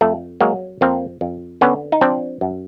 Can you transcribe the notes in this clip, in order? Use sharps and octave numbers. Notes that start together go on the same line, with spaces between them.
F2 A3
F#3 G#3 A#3
F2 A#3 C4
F2
D3 B3 C#4
D#4
F3 C4 D4
F#2